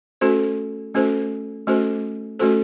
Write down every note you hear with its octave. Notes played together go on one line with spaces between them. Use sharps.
A3 C#4 F#4 A4 C5
A3 C#4 F#4 A4 C5
A3 C#4 F#4 A4 C5
A3 C#4 F#4 A4 C5